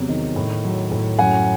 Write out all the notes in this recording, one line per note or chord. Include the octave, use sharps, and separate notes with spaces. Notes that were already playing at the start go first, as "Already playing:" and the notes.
Already playing: E2 C3 F#3
D#3
A2
F#3
A2
F#2 F#5 G#5